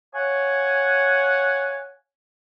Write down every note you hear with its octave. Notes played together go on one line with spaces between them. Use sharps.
C#5 F5 F#5 G#5